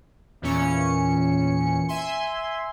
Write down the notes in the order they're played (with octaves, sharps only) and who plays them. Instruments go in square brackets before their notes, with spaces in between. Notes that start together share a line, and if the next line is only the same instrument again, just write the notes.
[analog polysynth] E2 A#2 E3 C#4 C#7
E5 G#5 C6